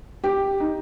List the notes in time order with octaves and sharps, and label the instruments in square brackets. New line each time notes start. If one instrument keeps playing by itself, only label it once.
[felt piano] G4
D#4